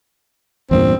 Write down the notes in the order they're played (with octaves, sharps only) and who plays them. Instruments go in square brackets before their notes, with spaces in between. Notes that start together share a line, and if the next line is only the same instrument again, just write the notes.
[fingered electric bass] E2 G2 A#2 [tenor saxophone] C4